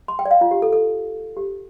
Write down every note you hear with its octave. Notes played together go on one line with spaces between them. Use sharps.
C6
G5
D5
F5
F4
G4
A4
A4
G4